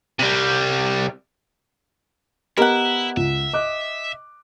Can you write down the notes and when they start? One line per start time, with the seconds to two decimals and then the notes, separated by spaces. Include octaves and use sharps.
0.19 C3 G3
2.57 B3 E4 G4 A#4 D#5 F#5
3.17 C#2 E5
3.53 D#5 D6 F#6